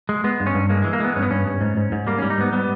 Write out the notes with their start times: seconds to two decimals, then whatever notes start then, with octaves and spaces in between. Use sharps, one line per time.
0.09 G#3
0.24 G#3 B3
0.40 G2
0.47 C#4
0.55 G2
0.69 G#3 A#3
0.82 E3 G#3
0.93 A#3
1.00 G#3 B3
1.16 G2 C#4
1.22 B3
1.31 G2 C#4
1.47 G2
1.61 G#2
1.77 G#2
1.92 G#2
2.07 G3 A#3
2.18 G3 C#4
2.30 D#4
2.38 G#2 B3
2.53 G3 B3